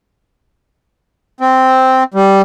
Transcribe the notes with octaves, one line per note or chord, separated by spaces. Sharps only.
C4
G3